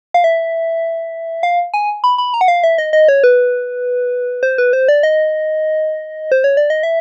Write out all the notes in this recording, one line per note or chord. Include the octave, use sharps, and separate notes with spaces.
F5
E5
F5
G#5
B5
B5
A#5
F#5
F5
E5
D#5
D#5
C#5
B4
C5
B4
C5
D5
D#5
C5
C#5
D5
D#5
E5